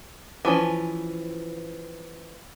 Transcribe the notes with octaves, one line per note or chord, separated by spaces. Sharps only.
E3 F3 C#4